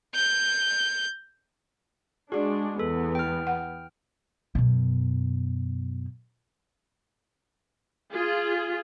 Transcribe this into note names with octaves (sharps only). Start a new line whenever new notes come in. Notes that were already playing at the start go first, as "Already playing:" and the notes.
G6
G#3 D4 F#4 G#4 D5
E2 B3 A4
G5 F6
F#5
F#2 B2
F4 G#4